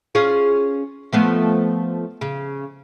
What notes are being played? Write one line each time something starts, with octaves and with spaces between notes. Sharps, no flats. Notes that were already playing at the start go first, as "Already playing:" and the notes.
C#4 F4 G#4
F3 A3 B3
C#3